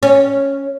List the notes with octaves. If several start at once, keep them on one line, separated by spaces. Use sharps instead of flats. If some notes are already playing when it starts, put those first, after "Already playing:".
C#4